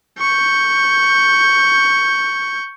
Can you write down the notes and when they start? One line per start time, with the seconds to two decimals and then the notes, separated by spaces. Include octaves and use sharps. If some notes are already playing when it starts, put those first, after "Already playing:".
0.19 C#6 G6